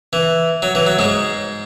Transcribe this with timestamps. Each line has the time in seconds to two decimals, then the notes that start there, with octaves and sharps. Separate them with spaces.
0.13 E3
0.62 F#3
0.75 E3
0.87 F#3
0.99 G#2 G#3